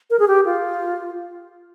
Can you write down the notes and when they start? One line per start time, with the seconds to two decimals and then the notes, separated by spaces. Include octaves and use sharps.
0.10 A#4
0.19 G#4
0.28 G4
0.46 F4